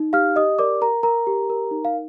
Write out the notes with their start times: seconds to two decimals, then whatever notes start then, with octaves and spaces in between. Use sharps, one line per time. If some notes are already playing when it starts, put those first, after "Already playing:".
Already playing: D#4
0.13 G4 F5 F6
0.36 G4 D#5 D#6
0.59 A#4 D5 D6
0.82 A#4 A#5
1.03 A#4 A#5
1.27 G4
1.50 A#4
1.71 D#4
1.85 F5